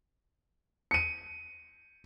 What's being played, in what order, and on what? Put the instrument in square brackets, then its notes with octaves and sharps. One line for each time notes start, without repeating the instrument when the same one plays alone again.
[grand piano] C#7 D#7